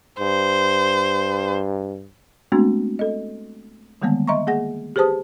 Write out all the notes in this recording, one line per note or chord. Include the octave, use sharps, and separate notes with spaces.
G2 C5
G#3 A3 B3 C4 D4 F#4
A4 D#5
D3 D#3 G3 G#3 A#3 B3
D#5 E5 A#5 C6 C#6
A#3 G#4 F#5 A#6
G4 G#4 B4 C5 A5 D#6